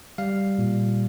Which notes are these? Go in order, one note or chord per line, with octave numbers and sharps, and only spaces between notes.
G3 F5
A#2